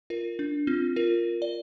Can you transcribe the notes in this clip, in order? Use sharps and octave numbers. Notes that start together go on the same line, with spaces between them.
F4 A#4
D4
C4 F4
F4 A#4
D5